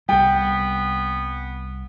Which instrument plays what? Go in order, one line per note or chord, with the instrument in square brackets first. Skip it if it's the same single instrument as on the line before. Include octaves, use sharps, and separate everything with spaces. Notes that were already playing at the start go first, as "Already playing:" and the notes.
[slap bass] C2 G3 [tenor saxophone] B3 [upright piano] G5